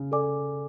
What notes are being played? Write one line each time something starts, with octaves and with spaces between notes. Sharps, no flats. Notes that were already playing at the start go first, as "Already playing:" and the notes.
Already playing: C#3
A4 D5 G#5 D6